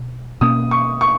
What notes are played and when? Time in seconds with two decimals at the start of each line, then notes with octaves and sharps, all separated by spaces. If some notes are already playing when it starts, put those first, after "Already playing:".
Already playing: B2
0.41 B2 A#3 C#4 D#6
0.71 C#6
1.01 C#6